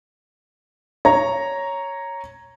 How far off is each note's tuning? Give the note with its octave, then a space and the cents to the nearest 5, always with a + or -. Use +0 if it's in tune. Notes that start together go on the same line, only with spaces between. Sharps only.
C#5 +0 A#5 +0